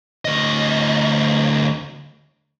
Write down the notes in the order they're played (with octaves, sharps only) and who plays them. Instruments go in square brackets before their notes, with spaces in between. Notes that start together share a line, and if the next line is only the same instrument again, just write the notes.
[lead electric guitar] D2 D#5